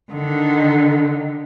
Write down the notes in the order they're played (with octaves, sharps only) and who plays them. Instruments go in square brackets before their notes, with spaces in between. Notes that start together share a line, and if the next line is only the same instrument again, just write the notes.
[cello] D3 D#3